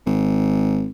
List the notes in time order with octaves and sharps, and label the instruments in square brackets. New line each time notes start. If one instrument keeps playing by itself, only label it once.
[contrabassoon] G#1